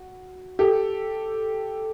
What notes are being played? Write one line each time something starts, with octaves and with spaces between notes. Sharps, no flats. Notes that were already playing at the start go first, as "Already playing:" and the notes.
Already playing: F#4
G4 A4